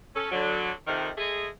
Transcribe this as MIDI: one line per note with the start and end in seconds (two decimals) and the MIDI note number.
0.15 0.31 61
0.15 0.31 69
0.32 0.70 50
0.32 0.70 54
0.87 1.09 41
0.87 1.09 48
0.87 1.09 51
1.18 1.48 56
1.18 1.48 57
1.18 1.48 68